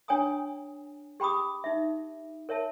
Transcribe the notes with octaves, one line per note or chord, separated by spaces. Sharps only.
D4 C#5 G5 G#5 A#5 D#6
G4 G5 B5 D6 D#6
D#4 E5
A#4 C#5 E5 A5